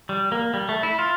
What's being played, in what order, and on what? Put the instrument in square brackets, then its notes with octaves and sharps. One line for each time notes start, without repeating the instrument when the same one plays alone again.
[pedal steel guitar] G3
A#3
G3
A3
E4
F4